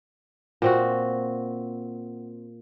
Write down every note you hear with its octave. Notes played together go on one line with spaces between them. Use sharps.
A#2 C4 F#4